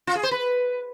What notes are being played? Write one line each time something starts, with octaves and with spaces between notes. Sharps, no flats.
F4
G#4
C5
B4